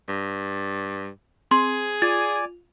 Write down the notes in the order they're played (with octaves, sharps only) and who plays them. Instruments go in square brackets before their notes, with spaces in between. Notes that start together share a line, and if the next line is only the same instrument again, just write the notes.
[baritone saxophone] G2
[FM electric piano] C4 [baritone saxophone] G#4 [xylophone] C6
[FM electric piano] F4 [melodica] D5 G#5 [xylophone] A6